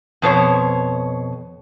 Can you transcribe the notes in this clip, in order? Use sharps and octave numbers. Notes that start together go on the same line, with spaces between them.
F2 B2 C5 C#5